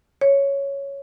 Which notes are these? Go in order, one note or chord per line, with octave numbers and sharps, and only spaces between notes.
C#5